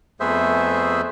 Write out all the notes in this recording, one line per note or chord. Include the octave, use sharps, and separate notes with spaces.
F2 A3 B3 G#4 C5 E5